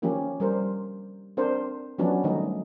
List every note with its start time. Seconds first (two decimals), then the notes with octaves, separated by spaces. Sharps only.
0.02 D#3 F3 A#3 C#4 G4
0.40 G3 A#4 C5
1.37 C4 D4 A#4 C5
1.98 F3 F#3 B3 C#4 D4
2.24 D#3 G3 A3 D#4